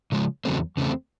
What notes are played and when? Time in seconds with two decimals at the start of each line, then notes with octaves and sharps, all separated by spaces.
0.12 C#3 F3 G#3
0.45 E2 C#3 F#3 A3 C4
0.77 E2 C#3 F#3 A3 C4